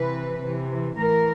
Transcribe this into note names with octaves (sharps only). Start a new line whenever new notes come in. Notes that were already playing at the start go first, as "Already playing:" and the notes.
Already playing: C3 E3 B4
C3 E3
A2 E3 A#4